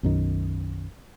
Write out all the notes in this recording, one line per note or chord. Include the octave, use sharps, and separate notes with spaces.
B1 F#2 D#3